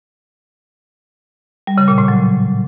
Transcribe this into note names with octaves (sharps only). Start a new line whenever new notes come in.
G3
C#3
A#2
A2
F#3